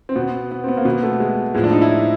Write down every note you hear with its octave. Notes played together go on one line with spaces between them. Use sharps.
C4
B2 B3
B3
C4
B3
A#3
B2 B3
A3
G#3
A2 F3 G#3
D4
D#4
E4